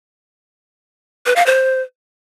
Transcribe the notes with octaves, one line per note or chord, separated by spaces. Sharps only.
B4
F5
C5